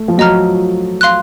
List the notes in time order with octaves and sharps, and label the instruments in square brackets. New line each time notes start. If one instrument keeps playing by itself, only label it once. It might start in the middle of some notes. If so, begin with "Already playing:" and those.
Already playing: [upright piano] A3
F3
[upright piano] F#3 [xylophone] D#5 A#5 F6
[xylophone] F5 C6 F#6